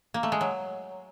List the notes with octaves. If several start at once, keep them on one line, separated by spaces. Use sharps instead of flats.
A#3
A3
G#3
F#3